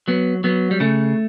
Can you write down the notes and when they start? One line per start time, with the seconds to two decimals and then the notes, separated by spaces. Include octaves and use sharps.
0.08 F#3 B3
0.44 F#3 B3
0.71 G3
0.80 C#3 A3